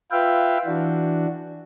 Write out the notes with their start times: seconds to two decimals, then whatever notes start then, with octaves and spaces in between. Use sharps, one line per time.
0.11 F4 B4 E5 F5 G5
0.66 E3 D4 F#4